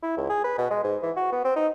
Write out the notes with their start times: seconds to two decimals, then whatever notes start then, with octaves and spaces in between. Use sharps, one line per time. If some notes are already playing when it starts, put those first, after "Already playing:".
0.03 E4
0.17 C#2
0.29 G#4
0.44 B4
0.58 B2
0.71 G#3
0.84 G#2
1.02 E3
1.16 F#4
1.32 B3
1.45 C4
1.56 D#4